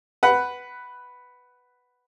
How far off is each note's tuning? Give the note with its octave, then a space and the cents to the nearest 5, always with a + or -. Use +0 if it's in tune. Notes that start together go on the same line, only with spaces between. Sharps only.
B4 +0 F#5 +10